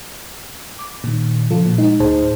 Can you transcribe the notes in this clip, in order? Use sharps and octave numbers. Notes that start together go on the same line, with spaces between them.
D6
A#2 D#3
C#3 F3 F4 A4
A#2
G#3 D#4
D2 A2 D#4 G#4 C5 A5